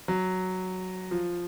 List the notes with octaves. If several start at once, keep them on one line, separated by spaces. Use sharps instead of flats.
F#3
F3